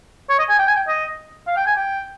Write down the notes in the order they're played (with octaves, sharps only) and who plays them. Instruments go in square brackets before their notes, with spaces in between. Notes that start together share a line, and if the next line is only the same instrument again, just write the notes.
[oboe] C#5
D#5
G#5
G5
G#5
G5
D#5
F5
G5
G#5
G5